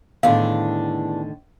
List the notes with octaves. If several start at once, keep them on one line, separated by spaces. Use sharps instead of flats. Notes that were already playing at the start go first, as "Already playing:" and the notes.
E2 A2 D3 D#3 D4 F5